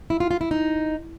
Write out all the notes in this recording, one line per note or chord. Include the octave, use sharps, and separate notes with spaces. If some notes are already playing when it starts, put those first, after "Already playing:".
E4
F4
F4
E4
D#4